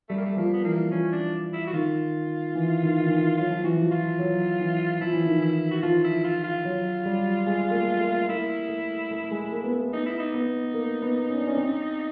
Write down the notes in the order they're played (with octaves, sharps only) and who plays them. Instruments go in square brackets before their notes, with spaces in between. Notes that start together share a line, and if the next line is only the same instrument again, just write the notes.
[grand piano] G3 [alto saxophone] A3
[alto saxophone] A#3
A3
[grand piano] F3 [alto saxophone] A#3
[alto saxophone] B3
[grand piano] E3 [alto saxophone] A#3
[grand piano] F3 [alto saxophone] C#4
[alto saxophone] D4
E4
F#4
[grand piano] D#3 [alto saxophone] F4
[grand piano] E3
D#3
D#3
E3
[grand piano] F#3 [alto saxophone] F4
[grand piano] F3
[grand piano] E3 [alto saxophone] F#4
[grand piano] F3
[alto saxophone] F4
[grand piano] F#3
E3
[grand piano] F3 [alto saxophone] E4
[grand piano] E3
D#3
[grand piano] E3 [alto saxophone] E4
[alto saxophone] F#4
[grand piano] F3 [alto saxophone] F4
[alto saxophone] E4
F4
F4
[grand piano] F#3
G3
G#3
A#3
A3
A#3
[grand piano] A#3 [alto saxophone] E4
[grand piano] A3
A3
G#3
A#3
B3
A#3
[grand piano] B3 [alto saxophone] D#4
[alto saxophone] E4
D#4
[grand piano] B3
A#3
B3
C#4
D4
C#4
C4